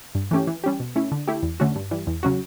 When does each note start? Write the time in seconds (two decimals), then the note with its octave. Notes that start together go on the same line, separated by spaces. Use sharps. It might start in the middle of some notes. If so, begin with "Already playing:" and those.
0.15 G2
0.31 E3 A3 C#4 G4
0.47 E3
0.64 G3 C#4 G4
0.80 B2
0.96 A3 C#4 E4
1.12 D3
1.28 A3 E4 G4
1.43 E2
1.60 D3 A3 C#4 F#4
1.76 G2
1.91 E3 G3
2.07 E2
2.23 C#3 F#3 C#4 F#4